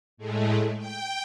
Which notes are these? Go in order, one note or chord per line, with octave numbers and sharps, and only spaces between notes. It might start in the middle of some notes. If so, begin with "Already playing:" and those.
A2 G#3 A3
G5